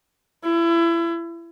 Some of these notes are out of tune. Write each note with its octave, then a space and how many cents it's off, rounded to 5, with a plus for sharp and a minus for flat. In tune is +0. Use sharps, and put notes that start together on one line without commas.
E4 +30